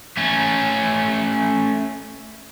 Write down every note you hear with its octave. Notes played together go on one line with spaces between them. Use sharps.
A3 C#4